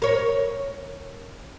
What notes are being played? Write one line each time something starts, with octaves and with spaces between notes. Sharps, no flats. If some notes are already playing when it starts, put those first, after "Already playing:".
A#4 C#5